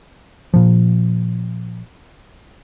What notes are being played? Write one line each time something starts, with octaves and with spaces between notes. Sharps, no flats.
A#2 F3